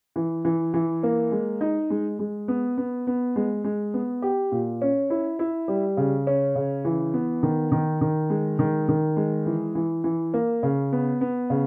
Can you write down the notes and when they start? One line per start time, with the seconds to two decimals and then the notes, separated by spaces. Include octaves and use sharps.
0.16 E3
0.45 E3
0.74 E3
1.03 A#3
1.32 G#3
1.61 D#4
1.90 G#3
2.19 G#3
2.48 B3
2.78 B3
3.07 B3
3.36 G#3
3.64 G#3
3.94 B3
4.22 G4
4.52 A#2
4.81 C#4
5.10 E4
5.39 E4
5.68 G3
5.97 C#3
6.27 C#4
6.55 C#3
6.85 E3
7.14 B3
7.43 D#3
7.72 D#3
8.01 D#3
8.30 G#3
8.59 D#3
8.88 D#3
9.17 G#3
9.46 E3
9.75 E3
10.04 E3
10.34 A#3
10.63 C#3
10.92 B3
11.21 B3
11.50 C#3